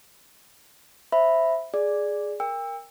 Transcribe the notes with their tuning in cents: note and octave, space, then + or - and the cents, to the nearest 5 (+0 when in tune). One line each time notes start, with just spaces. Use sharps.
C5 +0 E5 +0 B5 +0
G#4 +0 D5 +0
A#4 +0 G5 +35 E6 +0